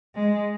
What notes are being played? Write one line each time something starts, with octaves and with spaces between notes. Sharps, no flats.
G#3